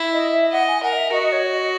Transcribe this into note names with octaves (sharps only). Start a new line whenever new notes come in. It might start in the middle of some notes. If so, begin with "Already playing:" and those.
Already playing: E4
D#5
E5
D#5 F#5
G#5
A#4 F#5
D#5
E5
F#4 D#5
D#5
C#5
D#5